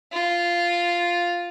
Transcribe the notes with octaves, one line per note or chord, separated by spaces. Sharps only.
F4